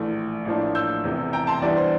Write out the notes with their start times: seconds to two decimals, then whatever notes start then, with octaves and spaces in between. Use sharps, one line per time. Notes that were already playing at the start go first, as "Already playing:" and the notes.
Already playing: A#1 A2 E3 A3
0.45 A1 A2 F3 A#3 D4
0.75 E6 G6
1.04 E1 E2 C3
1.33 G5 A#5
1.47 A5 C6
1.62 E2 E3 G3 D4 D5
1.77 C5